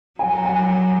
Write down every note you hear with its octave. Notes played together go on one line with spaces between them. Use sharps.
F#3 G#5
A#5
G#5
A#5
A#5